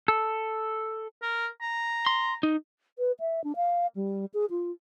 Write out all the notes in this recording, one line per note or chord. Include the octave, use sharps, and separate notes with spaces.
A4
A#4
A#5
C6
D#4
B4
E5
D4
F5
G3
G#4
F4